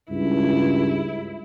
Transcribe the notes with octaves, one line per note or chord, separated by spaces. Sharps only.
C#2 G2 E4